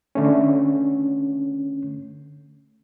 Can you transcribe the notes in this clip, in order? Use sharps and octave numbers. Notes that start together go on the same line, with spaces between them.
D3 A3 C#4